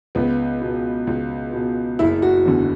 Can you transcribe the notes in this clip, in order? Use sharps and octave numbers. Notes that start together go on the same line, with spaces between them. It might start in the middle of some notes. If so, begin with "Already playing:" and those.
C#2 B3
B2
C#2
B2
F#1 E4
F#4
E2 D3